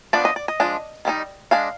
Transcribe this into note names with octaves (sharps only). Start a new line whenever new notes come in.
F3 B3 D4 D5
D#5
D5
D#5
F3 G#3 D4
D#3 G3 C4 D#4
G#3 D4 F5